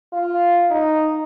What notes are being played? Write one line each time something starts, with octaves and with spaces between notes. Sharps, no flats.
F4
D#4